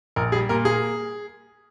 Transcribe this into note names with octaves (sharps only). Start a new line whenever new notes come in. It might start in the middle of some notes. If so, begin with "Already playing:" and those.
A#1 A#4
G3 G#4
A#2 A#4
A#3 G#4